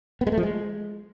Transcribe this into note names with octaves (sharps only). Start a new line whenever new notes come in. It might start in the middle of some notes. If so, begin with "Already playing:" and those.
B3
G#3
A3
F3
G#3